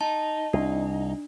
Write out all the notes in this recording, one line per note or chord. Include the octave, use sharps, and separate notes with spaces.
D#4 A5
C2 D4